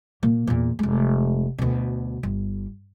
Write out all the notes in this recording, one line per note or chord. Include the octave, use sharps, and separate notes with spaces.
A#2 A#3
E2 A#2
F1 G#3
D2 B2
G1